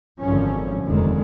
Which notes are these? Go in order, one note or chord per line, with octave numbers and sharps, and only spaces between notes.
G#1 F#2 D3 F3 C#4
F1 D#2 D3 D#3 G#3